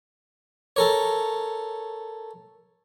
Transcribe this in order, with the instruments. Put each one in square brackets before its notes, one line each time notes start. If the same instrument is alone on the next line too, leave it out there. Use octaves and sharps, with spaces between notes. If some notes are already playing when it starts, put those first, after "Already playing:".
[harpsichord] A4 A#4 C#5